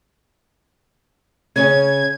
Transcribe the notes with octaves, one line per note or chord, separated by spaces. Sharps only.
C#3 C#4 G#6